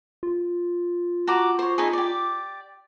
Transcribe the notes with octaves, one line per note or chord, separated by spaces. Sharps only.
F4
F#4 A#5 D6
C5 C#5
D#4 E4 G#4
G4 D5